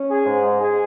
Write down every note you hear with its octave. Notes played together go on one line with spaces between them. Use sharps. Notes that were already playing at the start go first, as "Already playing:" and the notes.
Already playing: C#4
G#4
G#2
G#3
G#4